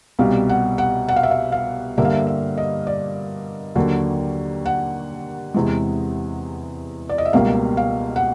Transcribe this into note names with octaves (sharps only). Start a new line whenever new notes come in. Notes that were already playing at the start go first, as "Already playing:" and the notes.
C2 B2 G3 F5
F#5
F#5
F#5
F5
E5
F5
F5
G2 D3 G3 A#3 E5
F5
E5
E5
D#5
D5
D#2 D3 F#3 A#3
F#5
E2 C3 E3 G#3
D5
D#5
E5
C#2 B2 G3 A#3 F5
F5
F#5